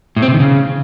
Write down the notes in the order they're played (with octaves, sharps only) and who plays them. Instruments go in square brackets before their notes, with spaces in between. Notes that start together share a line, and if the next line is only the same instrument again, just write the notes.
[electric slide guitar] A2
C4
C3
D#3
C#3